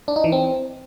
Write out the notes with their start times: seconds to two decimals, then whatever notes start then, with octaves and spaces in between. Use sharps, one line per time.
0.08 D4
0.16 D#4
0.24 E3
0.32 C4